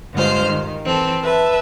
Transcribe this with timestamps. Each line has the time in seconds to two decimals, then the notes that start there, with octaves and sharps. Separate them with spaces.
0.13 G2 D3 G#3 F4 C5 F6
0.44 D#3
0.85 E3 C4 A4
1.23 B4 E5 A5